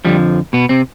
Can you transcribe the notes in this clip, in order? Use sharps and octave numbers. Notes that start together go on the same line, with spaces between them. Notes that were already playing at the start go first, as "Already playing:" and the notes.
F2 D3 F3 G3
B2 B3
C3 C4